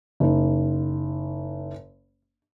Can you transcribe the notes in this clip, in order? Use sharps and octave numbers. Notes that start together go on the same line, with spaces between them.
F#1 D#3